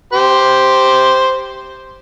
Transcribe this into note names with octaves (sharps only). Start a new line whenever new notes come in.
G4 C5